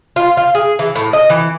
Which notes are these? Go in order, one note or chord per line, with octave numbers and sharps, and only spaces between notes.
F4
F4
G#4
E3
A2
D#5
E3